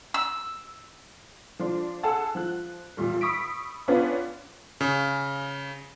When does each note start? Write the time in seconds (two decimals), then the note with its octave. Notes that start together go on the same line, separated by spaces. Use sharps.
0.14 E6
1.59 F3 D4 C6
2.03 G#4 A4 F#5 A5 E6
2.35 F3 F#6
2.97 E2 A#2 G3
3.21 B5 C#6 D#6 E6 B6 D7
3.88 B3 C#4 D4 F4 B4
4.81 C#3